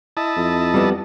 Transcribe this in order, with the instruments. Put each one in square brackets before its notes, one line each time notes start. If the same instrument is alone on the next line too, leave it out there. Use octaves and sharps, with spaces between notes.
[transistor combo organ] E4 D#5 A5
[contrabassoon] F2
[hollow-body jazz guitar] G3 B3